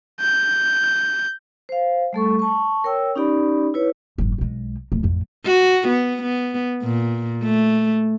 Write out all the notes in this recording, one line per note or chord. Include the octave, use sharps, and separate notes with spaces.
G6
C5 F5
G3 A3 A4 C#6
A5 C#6
A#4 C#5 G5 E6
C#4 D#4 G4 D5 B5
E4 B4 C#5
F#1 G#2
B1 G#3
D1 A#2
A1 F2
F#4
B3
B3
A#2
A3